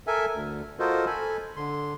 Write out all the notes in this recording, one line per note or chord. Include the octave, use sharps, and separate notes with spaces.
A4 A#4 E5 G#5
D2
F4 F#4 A4 A#4 C5 D#5
A4 G#5 B5
D3 C6